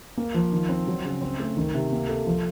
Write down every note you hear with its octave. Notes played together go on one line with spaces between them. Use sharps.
A#3
F3
D#3
C4
F#3
C#3
C4
A3
D#3
C3
A#3
A4
F3